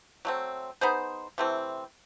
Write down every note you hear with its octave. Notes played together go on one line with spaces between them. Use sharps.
F#3 A3 C4
B3 D#4 G#4 C5
C3 E3 A3 C4